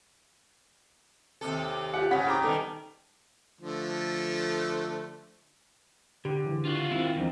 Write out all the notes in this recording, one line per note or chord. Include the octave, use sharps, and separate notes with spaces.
D#2 C3 A4
F4 G4 F#5
G#2 C#3 C#4 F#5 B5 B6
E4 G#4 D5 G5 A#5 D6
B2 D#3 G3 D#4 A4 C5
D3 F3 A3
D3 G4
C#3 E3
D4 F4 F#4
D#3 C4 E4
E2 F3 C4 D4 D#4